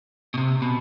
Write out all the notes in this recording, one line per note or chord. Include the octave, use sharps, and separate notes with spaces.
B2
C3
B2